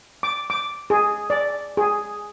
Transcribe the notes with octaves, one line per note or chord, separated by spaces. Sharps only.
D6
D6
G#4
D5
G#4